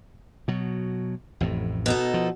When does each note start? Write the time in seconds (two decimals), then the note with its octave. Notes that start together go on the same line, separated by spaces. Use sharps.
0.48 B2 F#3
1.41 A1 F2 A2
1.86 B2 D#4 A4
2.14 F3